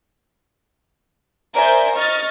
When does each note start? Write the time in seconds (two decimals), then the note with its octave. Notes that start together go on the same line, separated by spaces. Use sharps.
1.54 A#4 C5 D5 E5 G#5 G6
1.95 D#5 C#6 F6 A6